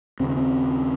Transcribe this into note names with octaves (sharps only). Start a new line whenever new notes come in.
D#2 C#3 C4
C#4
C4